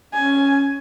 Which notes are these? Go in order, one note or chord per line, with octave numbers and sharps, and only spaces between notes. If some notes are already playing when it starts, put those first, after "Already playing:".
C#4 G#5